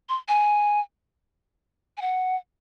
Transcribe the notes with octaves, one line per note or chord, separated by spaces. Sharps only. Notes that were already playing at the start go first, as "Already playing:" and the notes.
C6
G#5
G#5
F#5